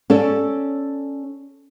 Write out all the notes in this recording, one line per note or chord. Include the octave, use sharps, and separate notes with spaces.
C#4 A4 D5